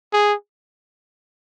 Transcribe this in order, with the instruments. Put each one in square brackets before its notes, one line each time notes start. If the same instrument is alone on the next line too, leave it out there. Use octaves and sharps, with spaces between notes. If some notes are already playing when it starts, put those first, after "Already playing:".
[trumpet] G#4